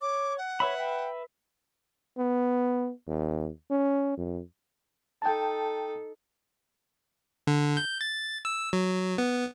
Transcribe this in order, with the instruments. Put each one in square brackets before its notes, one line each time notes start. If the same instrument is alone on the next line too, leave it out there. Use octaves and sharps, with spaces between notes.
[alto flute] C#5 [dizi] D6
[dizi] F#5
[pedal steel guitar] B4 E5 B5 [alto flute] C#5
[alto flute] G5
[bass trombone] B3
D#2
C#4
F2
[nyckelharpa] D#4 A4 [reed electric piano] G5 A5
[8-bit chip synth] D3
G6
A6
E6
F#3
B3